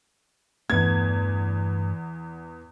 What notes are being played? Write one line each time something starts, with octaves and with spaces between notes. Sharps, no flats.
E2 G2 A3 B3 G#6